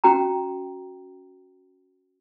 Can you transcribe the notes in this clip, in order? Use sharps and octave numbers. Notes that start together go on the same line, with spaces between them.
C#4 F#4 G5 A#5